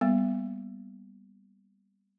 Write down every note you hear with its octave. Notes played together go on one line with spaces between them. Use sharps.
G3 A#3 B3